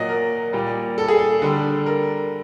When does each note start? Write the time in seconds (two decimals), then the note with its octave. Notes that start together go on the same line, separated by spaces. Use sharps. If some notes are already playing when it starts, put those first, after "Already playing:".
Already playing: A#2 F#3 D5 D#5
0.09 A#4
0.53 A#2 G3
0.98 A4
1.08 G#4
1.18 A4
1.42 D3 G3
1.86 A#4